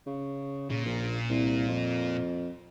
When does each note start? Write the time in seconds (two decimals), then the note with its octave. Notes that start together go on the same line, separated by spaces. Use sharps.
0.07 C#3
0.70 A#2 C#3
0.85 A#1
1.30 C2
1.68 F2